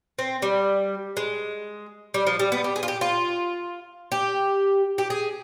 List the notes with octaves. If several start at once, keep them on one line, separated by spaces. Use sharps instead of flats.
C4
G3
G#3
G3
F3
G3
B3
G4
G#4
F4
G4
F4
G4
G4
G#4